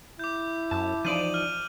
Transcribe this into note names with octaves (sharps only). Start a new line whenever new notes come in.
E4 D6 G6
F#2 A5
E3 F3 D#4 D5 D#7 F#7
F6 D#7